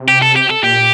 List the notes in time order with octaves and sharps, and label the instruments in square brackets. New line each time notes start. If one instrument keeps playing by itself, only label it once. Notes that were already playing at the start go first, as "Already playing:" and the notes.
Already playing: [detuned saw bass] C3
[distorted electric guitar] G4
A4
G4
A4
[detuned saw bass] A#2 [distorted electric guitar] G4